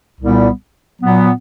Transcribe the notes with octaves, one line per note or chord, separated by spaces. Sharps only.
C2 A#2 G3 B3
A#2 F#3 B3